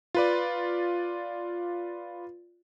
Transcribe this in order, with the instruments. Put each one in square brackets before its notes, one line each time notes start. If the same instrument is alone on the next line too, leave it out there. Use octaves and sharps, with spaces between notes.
[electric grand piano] F4 B4 D5